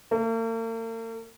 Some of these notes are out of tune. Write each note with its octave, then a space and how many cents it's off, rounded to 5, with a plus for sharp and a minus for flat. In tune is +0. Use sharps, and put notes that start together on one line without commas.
A#3 -45